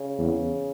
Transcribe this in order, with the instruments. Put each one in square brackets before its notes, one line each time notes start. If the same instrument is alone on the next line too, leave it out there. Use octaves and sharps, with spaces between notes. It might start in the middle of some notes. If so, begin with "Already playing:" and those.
Already playing: [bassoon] C#3
[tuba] E2